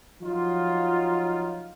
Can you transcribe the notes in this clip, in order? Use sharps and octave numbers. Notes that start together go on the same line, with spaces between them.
F3 F#3 D#4 F4